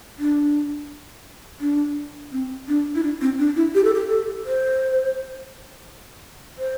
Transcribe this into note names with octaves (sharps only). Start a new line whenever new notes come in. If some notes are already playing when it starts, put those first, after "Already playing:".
D4
D4
C4
D4
E4
D4
C4
D4
E4
G4
A4
G4
A4
C5
C5